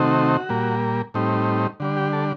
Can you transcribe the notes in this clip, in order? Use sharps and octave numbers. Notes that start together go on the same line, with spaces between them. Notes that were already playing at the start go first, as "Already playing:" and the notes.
Already playing: C3 D#3 A3 C4 D#4 F#4
A#2 G3 A#3
A2 G3 C4 D#4
D3 G3 D4
G4
A4